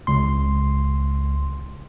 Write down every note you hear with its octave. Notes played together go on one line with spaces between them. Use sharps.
C#2 C6